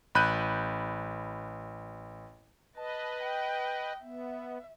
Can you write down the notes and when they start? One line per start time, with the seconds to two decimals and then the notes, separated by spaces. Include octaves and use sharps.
0.15 A1 B5 F#6 G6 D#7
2.76 B4 D#5 A5
3.23 G5
4.02 B3 E5